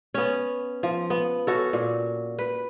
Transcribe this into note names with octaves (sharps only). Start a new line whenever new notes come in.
B3 C#4
F3
B3
C#4 F#4 A4
A#2
B4